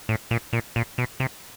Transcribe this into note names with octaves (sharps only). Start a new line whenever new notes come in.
A2
A#2
A#2
A#2
B2
C3